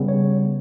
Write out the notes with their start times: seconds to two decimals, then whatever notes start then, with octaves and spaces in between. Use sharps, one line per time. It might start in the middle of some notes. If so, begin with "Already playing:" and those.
Already playing: C#3 G3 B3
0.08 C#5